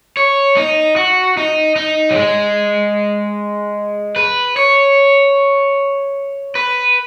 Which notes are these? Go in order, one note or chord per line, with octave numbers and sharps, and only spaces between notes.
C#5
D#4
F#4
D#4
D#4
F#3
G#3
B4
C#5
B4